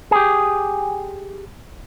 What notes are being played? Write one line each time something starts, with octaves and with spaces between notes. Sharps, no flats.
G4 G#4